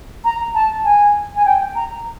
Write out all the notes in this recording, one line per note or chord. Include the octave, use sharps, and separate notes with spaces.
A#5
A5
G#5
G#5
G5
A#5